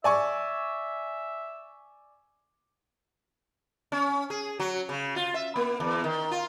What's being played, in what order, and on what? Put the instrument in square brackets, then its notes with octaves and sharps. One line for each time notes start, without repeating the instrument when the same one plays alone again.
[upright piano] D5 G#5 C#6 [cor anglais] E5
[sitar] C#4
G#4
F#3
C#3
F4
E5
A#3
E2
D#3
F4